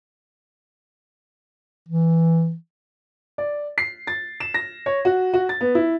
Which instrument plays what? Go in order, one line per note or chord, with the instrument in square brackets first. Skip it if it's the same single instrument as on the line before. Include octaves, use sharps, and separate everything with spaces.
[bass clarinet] E3
[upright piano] D5
C7
A6
E7
A#6
C#5
F#4
F#4
A6
B3
E4